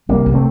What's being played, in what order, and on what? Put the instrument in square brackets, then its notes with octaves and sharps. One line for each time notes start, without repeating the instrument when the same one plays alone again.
[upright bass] C3 [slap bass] G3 A#3
[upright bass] C3
[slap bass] A3 C4